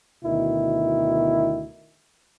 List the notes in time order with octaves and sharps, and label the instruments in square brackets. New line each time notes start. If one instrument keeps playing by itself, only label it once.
[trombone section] D2 B2 D#3 E4